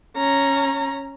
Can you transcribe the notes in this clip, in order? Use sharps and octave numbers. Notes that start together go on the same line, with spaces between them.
C#4 A#5